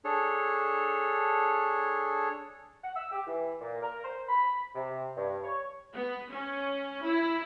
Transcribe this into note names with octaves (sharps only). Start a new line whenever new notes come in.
D4 G#4 A4 C#5
F#5
E6
G4
E3
A#2
A#4
C5
B5
C3
G2
C#5
B3
C#4
E4